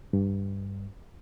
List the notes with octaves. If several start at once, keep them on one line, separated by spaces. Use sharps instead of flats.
G2